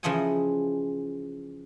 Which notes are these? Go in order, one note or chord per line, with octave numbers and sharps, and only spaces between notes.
C#3 E3 F3 D#5 F#5 G#5